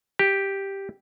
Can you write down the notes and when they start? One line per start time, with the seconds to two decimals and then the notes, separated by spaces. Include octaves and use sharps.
0.19 G4